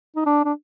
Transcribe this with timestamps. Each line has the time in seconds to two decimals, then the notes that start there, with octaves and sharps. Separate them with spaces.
0.16 D#4
0.26 D4
0.45 D4